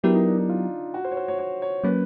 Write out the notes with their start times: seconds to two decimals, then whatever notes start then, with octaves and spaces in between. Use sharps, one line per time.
0.03 F#3 B3 D4 E4 G4 A#4
0.14 D#4
0.27 D4
0.38 D#4
0.49 F4
0.94 F#4
1.05 C5
1.12 C#5
1.17 C5
1.28 C#5
1.39 C#5
1.62 C#5
1.84 F#3 A#3 C#4 B4